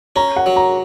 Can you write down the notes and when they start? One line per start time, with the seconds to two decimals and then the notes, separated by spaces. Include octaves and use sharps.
0.16 C#4 A#5
0.36 F#5
0.46 F#3
0.56 A#5